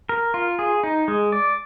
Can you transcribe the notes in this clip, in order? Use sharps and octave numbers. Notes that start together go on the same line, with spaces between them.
A#4
F4
G#4
D#4
G#3
D5